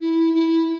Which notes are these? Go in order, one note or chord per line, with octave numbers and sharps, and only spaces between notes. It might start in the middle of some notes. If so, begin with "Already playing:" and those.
E4
E4